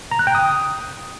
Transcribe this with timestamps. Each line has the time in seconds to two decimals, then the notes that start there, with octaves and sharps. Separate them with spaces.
0.11 A#5
0.19 F#6
0.27 G5
0.35 D#6